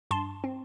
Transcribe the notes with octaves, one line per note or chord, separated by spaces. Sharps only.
G2 A5 C6
C4